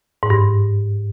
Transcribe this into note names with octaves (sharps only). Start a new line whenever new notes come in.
G#2
G2